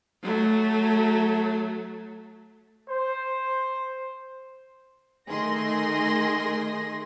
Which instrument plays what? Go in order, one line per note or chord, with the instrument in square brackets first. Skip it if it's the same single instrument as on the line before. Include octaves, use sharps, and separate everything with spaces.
[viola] F#3 A3
[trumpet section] C5
[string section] D#3 A3 G#4 C6 A#6